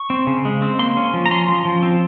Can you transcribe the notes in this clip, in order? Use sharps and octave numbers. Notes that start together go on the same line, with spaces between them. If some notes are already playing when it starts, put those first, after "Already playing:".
Already playing: C#6
C4
C#3
G#3
C4
A#3 C6
C#4
F3
A#5
C#4 C6
F3
F3
C4